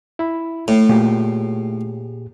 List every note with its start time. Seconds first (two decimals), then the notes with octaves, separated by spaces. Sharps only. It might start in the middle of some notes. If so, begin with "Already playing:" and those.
0.19 E4 B5
0.68 A2 A3
0.89 A#2 G4 G#4